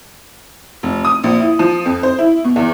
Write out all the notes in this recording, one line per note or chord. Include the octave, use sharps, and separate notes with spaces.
F1
D#6
A#1
E4
F3
F2
C5
E4
B2
E2